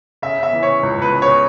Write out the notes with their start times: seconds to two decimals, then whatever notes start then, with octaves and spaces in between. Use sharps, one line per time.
0.22 C#3 E5
0.38 C#3 E5
0.53 E3
0.63 C#5
0.68 C#3
0.83 C#2
0.98 C#2 B4
1.13 C#3
1.22 C#5
1.27 C#3